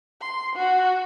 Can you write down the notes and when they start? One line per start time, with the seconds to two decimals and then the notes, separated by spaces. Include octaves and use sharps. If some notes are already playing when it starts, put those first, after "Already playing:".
0.21 C6
0.56 F#4